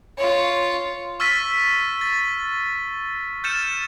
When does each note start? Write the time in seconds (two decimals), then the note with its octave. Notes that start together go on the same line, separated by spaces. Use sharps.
0.18 F4 C#5
1.20 C#6 E6 F6 A6 B6 D#7
2.01 A6
3.44 F6 G6 A6 C#7 D#7 E7